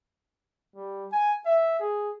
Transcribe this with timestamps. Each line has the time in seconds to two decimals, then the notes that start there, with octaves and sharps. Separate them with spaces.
0.76 G3
1.12 G#5
1.46 E5
1.80 G#4